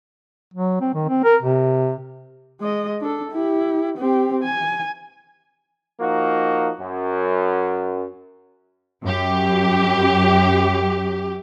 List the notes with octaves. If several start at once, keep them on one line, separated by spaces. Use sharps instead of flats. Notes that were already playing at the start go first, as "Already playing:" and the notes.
F#3
C4
D#3
C4
A#4
C3
G#3 D#5
D4 A4
E4 G4
C4 G4
G#5
F3 A#3 D#4 F#4
F#2
F#2 G4